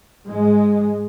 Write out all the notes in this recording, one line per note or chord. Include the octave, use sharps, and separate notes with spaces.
G#2 G#3